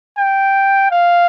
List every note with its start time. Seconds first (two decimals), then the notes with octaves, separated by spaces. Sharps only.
0.18 G5
0.91 F5